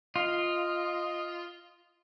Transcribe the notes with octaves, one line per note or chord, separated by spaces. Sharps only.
F4 D#5